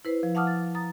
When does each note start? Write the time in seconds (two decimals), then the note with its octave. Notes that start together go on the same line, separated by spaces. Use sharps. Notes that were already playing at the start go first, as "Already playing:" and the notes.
0.05 E4 B4 C5
0.23 F3
0.35 F5 F#5 A5 D6 D#6 F6
0.47 A6
0.75 A#5 D#6 A6